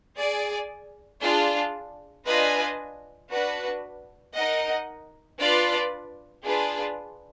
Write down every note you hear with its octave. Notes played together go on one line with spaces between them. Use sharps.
G#4 D5 G#5
D4 F4 G#4
D4 F4 B4 D#5 G#5
D4 F#4 B4
D#4 A#4 D#5 F#5
D4 F4 B4 D5
D4 F4 G#4 B4